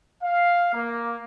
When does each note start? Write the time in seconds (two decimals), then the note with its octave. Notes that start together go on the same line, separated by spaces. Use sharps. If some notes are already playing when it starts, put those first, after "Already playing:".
0.23 F5
0.74 A#3